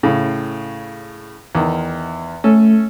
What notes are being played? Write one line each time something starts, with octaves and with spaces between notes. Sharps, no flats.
A2 C#3
E2 D#3
A3 C#4 A4